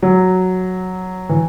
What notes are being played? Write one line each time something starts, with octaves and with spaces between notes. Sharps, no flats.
F#3
E3